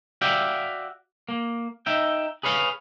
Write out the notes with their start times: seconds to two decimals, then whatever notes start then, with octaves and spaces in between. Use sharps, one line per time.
0.22 F#4 D5 E5 F5 G5
1.29 A#3
1.86 D#4 E5 G5
2.43 G#4 B4 C#5 F5